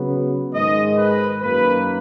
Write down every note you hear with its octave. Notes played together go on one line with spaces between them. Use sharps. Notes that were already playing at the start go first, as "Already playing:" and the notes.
Already playing: C#3 F#3 B3
G#2 D#3 G#3 D#5
B4
F#2 D#3 A#3 B4